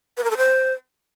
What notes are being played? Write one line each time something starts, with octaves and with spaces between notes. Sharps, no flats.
B4
A#4
A4
C5